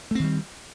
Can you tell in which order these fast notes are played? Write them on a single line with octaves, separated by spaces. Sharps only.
A3 C4 D#3 G3